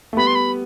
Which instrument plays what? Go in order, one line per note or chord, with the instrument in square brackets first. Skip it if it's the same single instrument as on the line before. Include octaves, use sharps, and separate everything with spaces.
[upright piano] A3
[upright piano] G3 B3 [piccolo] B5
[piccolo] C6
B5